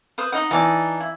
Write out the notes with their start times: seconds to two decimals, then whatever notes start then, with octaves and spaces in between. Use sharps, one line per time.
0.18 B4 C5 D#6
0.32 D#4 D#5 F#5
0.51 E3 D#4 D5 A5
1.00 E4